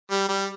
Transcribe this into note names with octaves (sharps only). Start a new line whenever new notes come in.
G3
G3